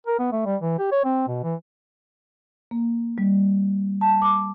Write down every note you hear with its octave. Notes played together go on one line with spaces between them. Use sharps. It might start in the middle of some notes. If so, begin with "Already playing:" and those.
A#4
B3
A3
G3
E3
G4
C#5
C4
B2
E3
A#3
G3
A5
D6